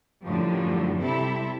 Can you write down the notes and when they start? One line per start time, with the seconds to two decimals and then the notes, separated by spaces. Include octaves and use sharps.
0.24 F#2 A2 D3 F3 G3
1.01 C3 G3 C4 E4 A4 E5